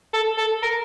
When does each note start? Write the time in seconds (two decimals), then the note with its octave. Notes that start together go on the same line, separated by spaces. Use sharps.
0.14 A4
0.37 A4
0.63 A#4